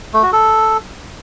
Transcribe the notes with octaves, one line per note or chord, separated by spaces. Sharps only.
A3
F#4
A4